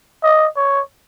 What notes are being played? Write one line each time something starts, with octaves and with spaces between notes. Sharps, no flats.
D#5
C#5